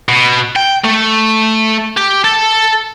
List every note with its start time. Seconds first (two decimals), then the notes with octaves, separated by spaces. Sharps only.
0.09 B2
0.56 G5
0.85 A3
1.97 G4
2.24 A4